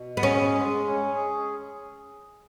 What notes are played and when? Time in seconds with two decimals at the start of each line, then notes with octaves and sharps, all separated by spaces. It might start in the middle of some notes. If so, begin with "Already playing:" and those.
Already playing: B2
0.17 B3
0.23 C#4 G#4
0.54 G#3
0.85 C#4
1.15 G#4